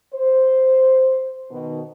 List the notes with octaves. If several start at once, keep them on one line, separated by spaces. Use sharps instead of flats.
C5
B2 D#3